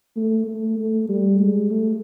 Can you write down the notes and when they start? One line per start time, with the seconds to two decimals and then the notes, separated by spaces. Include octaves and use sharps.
0.16 A3
0.47 A3
0.78 A3
1.09 G3
1.40 G#3
1.70 A3